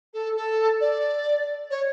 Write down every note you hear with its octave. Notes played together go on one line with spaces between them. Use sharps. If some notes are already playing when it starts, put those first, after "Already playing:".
A4
A4
D5
C#5